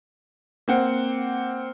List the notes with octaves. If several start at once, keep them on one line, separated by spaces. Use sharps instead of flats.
A#3 C4 F#5